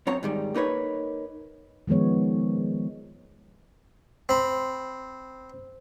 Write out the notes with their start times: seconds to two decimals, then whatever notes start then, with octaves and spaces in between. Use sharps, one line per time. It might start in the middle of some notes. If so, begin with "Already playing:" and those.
0.07 F#2 C4 C#5 A#5
0.23 G#2 D#3 G3
0.54 A#3 D#4 B4 C#5
1.87 D#3 F3 G#3 B3 C#5
4.29 C4 B5